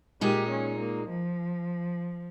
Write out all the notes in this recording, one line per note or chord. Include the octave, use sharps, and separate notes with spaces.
A#2 G#3 D#4 G4
C#4
A#3
F3